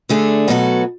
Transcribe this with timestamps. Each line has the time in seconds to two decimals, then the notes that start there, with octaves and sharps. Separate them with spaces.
0.09 D3 A3 D4 G#4
0.48 B2 F#3 B3 F#4 A4